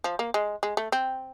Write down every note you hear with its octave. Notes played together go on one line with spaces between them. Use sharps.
F3
A#3
G#3
G#3
A3
C4